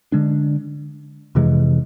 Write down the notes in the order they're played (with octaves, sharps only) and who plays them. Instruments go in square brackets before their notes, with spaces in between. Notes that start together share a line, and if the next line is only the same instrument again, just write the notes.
[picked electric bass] D3 G#3 D4
F2 C3 E3 G#3